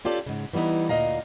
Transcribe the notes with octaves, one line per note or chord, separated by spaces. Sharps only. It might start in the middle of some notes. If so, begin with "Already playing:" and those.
C#4 F4 G4 A4 D5
G#2 C#3
E3 G3 B3 D#4 E4
D2 A#2 F#3 D#5 F5 A#5